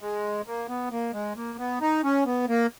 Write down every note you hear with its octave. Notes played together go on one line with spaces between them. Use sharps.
G#3
A#3
B3
A#3
G#3
A#3
B3
D#4
C#4
B3
A#3